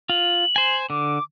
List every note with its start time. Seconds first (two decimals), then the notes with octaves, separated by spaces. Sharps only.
0.09 F4 F#7
0.56 C5 G#5
0.90 D3 D6